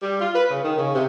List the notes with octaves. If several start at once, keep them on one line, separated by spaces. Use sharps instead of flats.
G3
F4
B4
C#3
D#3
C#3
C3